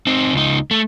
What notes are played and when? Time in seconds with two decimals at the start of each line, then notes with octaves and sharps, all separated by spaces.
0.07 C4 D#4
0.33 C#2 D#4
0.71 A3